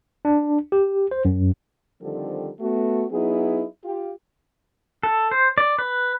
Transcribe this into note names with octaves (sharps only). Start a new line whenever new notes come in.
D4
G4
C5
F#2
D3 D#3 F3 G3 C4 A4
A3 B3 F#4
F#3 B3 D#4 E4 G#4
F4 G4
A4
C5
D5
B4